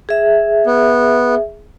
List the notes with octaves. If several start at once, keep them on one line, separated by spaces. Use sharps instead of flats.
G#4 E5
B3